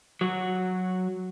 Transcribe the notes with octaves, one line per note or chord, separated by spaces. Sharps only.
F#3 F#4